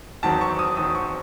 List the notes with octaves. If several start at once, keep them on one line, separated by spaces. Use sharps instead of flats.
E2 D#3 F#3 C4 A5
C#6
D#6
E2 D#3 F#3 C4 D#6
C#6